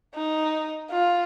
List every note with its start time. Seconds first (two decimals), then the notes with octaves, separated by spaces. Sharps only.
0.15 D#4
0.91 F4